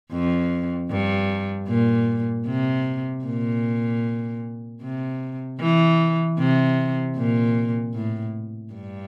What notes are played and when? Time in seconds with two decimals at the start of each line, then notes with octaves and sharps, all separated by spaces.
0.13 F2
0.91 G2
1.68 A#2
2.47 C3
3.25 A#2
4.82 C3
5.60 E3
6.39 C3
7.17 A#2
7.94 A2
8.74 G2